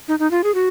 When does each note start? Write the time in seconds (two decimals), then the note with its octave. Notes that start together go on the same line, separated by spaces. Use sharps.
0.08 D#4
0.19 D#4
0.31 F4
0.44 G#4
0.55 F#4